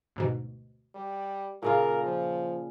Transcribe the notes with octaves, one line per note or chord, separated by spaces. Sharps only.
D2 G#2 B2
G3
A#2 C#3 F4 A#4
F3